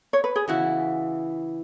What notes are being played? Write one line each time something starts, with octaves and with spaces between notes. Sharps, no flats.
C#5
B4
G#4
C#3 E3 B3 E4 F#4